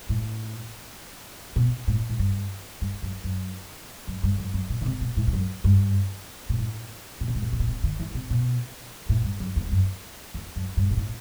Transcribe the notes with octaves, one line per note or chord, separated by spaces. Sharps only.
A2
B2
A2
A2
G2
G2
F#2
F#2
F#2
G2
F#2
F#2
B2
D3
C3
B2
A2
E2
F#2
G2
B2
A2
C3
B2
A2
B2
C3
B2
C3
D3
E3
C3
B2
A2
G2
F#2
E2
G2
F#2
E2
F#2
G2
B2
A2